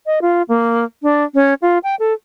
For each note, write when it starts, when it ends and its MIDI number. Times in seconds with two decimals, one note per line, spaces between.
0.06 0.19 75
0.22 0.42 65
0.49 0.84 58
1.03 1.24 62
1.35 1.54 61
1.62 1.78 65
1.83 1.95 79
1.99 2.13 69